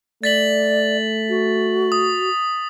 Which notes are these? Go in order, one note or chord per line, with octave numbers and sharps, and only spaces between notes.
A3 D5 A6 B6 F#7
F#4
D#6